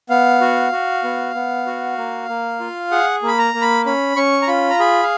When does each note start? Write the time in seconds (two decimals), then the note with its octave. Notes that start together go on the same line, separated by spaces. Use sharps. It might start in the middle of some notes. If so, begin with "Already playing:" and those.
0.10 B3 F5
0.41 F#4
0.72 F#4
1.04 B3
1.35 B3
1.66 F#4
1.98 A#3
2.29 A#3
2.60 F4
2.91 G#4 F#5
3.23 A#3 B5
3.38 A#5
3.54 A#3
3.62 B5
3.86 C#4 B5
4.16 C#4 C#6
4.42 A#5
4.47 F4 B5
4.70 A#5
4.79 G#4 B5
5.02 F5